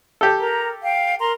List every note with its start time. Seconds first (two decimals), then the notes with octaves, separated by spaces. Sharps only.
0.21 G4 A4
0.40 A#4 A#5
0.83 F5 G5
1.20 A#4 A#5 C6